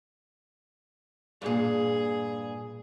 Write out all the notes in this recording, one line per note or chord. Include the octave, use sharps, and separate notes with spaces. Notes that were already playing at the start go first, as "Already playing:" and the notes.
G2 A#2 G#4